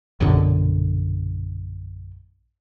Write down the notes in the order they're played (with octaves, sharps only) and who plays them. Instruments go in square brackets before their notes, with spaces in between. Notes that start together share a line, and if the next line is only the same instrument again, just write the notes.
[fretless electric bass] A#1 F#2 B2 D3